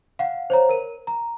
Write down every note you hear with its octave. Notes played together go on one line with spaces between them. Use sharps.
F5 F#5
C5 C#5 A#5
A#4 D#7
A#5